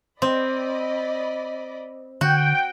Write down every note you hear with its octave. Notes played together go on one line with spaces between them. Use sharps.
C4 D5 D#5 B5
D3 F#4 G5